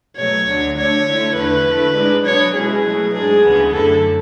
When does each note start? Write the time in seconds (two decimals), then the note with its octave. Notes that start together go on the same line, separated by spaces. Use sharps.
0.17 B2 F#3 A3 C#5
0.47 D2 D3 F#3
0.77 D3 A3 D4 C#5
1.06 D3 A3 E4
1.36 E2 D3 A3 B4
1.66 D3 A3 E4
1.96 G#2 G#3 D4
2.25 B2 F#3 B3 D4 C#5
2.55 B2 G#3 C#4 E4 G#4
2.85 B2 F#3 A3
3.14 G#2 G#3 D4 G#4
3.43 D2 C#3 E3 B3
3.73 F#2 D3 A3 E4 A4